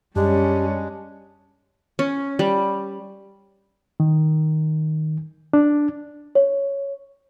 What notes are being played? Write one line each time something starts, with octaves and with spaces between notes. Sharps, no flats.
F#2 G3 G#3 C#4 D4 G4
C#4
G3
D#3
D4
C#5